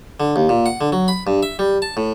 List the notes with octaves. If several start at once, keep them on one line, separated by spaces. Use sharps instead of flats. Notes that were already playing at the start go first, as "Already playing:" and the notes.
D3
D#2
A#2
F#5
D3
F#3
B5
G2
E5
G3
A5
A2